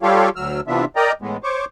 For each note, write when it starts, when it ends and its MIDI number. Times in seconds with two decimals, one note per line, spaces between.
0.03 0.29 55
0.03 0.29 65
0.03 0.29 67
0.03 0.29 69
0.03 0.29 73
0.03 0.29 77
0.36 0.61 38
0.36 0.61 54
0.36 0.61 88
0.36 0.61 89
0.68 0.85 48
0.68 0.85 52
0.68 0.85 59
0.68 0.85 62
0.68 0.85 65
0.68 0.85 76
0.96 1.12 70
0.96 1.12 74
0.96 1.12 75
0.96 1.12 79
0.96 1.12 82
1.22 1.37 45
1.22 1.37 52
1.22 1.37 56
1.22 1.37 59
1.43 1.65 72
1.43 1.65 73
1.43 1.65 85
1.43 1.65 86